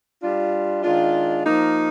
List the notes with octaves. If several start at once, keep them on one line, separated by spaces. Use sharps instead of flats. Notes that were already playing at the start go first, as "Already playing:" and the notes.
G3 D4 F4
D#3 G#3 D4 F4
F3 A#3 D#4